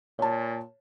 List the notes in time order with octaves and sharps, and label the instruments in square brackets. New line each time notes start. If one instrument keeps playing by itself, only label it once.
[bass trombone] A#2 [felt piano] C#5 A5